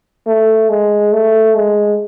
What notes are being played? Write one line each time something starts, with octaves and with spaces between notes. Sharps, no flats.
A3
G#3
A3
G#3